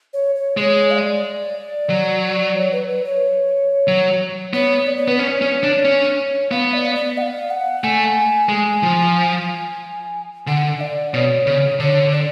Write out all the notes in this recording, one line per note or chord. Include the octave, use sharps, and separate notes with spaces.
C#5
C#5
G#3 C#5
F5
D5
F#3
C#5
B4
B4
C#5
F#3
B3 C#5
D5
C#5
B3 B4
C#4 C#5 D5
C#4
D4
C#4
B3 F5
D5
D5
F#5
F5
F#5
A3 G#5
G#3
F3
D3 F#5
D5
B2 C#5
C#3
D3 C#5
D5